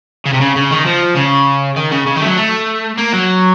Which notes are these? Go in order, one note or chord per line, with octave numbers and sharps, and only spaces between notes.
C#3
C3
C#3
C#3
D#3
F3
C#3
D#3
C#3
C#3
D#3
A3
F#3
A3
A#3
F#3